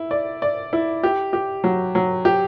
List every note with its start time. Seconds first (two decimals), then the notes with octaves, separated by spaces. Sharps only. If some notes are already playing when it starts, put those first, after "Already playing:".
Already playing: E4
0.11 D5
0.42 D5
0.73 E4
1.03 G4
1.33 G4
1.64 F#3
1.95 F#3
2.25 G4